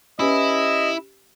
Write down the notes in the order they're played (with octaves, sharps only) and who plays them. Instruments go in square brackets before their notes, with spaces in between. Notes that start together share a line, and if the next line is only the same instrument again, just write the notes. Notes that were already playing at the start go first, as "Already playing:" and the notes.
[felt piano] C#4 G4 B4 [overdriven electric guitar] E4 [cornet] D#5